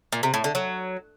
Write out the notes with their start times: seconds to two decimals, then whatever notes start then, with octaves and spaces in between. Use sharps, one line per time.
0.12 A#2
0.23 C3
0.34 A2
0.44 D3
0.55 F#3